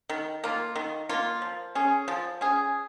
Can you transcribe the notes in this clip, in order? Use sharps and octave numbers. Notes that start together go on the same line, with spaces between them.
D#3
A#3 F4
D#3
A#3 F4
F3
C#4 G#4
F3
C#4 G#4